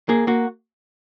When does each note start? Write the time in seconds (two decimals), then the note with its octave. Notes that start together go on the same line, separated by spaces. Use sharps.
0.09 A#3 G#4
0.27 A#3 F#4